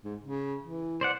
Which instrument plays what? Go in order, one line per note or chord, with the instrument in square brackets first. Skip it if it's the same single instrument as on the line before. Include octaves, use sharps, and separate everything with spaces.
[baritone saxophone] G#2
C#3
E3
[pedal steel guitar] C5 D5 F#5